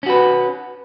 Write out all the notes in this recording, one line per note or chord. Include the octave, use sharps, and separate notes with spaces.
C#4 F#4 B4